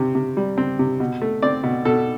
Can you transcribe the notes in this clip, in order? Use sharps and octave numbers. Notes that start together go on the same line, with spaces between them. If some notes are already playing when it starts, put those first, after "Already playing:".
Already playing: C3 C4
C3
G3
C4
C3
B2
A3
C4 D5
B2
B2 A4